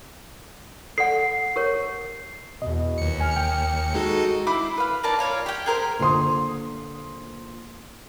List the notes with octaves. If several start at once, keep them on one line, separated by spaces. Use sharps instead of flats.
A4 D5 F#5 C7
G4 A#4 C#5
E2 B2 D#5
D#2 C#7
G#5 F6
G5
G#3 D#4 F#4 A4
E4 C5 B5 D6
B4 F5
A#3 D#4 D5 A5
F4 C#5 D5 F5
G4 G5
G#4 A#4 C5
A#2 D3 C5 C6 D#6